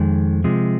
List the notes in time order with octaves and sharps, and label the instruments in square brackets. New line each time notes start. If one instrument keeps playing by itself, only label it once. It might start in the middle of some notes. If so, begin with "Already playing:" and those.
Already playing: [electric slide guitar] F2 D#3 G#3
C3 F3 G#3